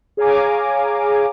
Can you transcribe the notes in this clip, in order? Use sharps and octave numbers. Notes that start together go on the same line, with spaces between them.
G#4 C#5 F5 G#5 A#5 D6